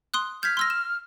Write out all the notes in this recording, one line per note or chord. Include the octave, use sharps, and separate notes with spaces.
C6 D#6 F#6
F6 G6 G#6 B6
C6 E6 A#6
E7